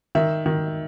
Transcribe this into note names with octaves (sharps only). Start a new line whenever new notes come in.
D#3 E5
D#3